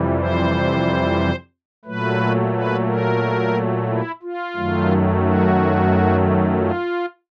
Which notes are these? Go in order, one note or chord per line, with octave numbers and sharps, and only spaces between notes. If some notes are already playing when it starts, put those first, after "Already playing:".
Already playing: F2 C3 E3 G3
C5
A#2 F#3 A3 B4
B4
A#4
E4
F4
F#2 D#3 F#3 A3
F#4
F4